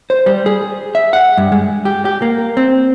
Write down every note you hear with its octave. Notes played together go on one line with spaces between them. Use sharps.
C5
G3
G#4
E5
F#5
G2
G#3
G4
G4
A#3
C4